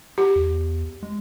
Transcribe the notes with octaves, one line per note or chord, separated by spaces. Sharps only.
G4
E2
G#3